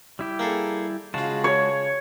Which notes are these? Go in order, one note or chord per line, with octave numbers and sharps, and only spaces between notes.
G3 E4 G4
A#3 G#4 A4
C#3 G#3 F4 F#4 A5
C#5